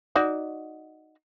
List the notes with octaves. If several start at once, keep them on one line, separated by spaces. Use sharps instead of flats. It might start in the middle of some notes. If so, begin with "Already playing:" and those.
D#4 F#4 D5